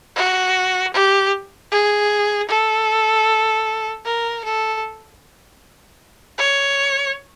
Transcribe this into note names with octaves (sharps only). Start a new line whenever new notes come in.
F#4
G4
G#4
A4
A#4
A4
C#5